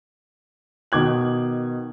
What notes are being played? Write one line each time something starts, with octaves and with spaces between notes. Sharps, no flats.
B2 D#3 D6 G#6 F#7